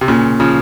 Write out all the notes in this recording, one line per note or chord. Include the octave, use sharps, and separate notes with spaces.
C3
A#2 C#3
C#3 F3